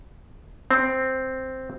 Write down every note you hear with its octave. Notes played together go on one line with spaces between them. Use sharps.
C4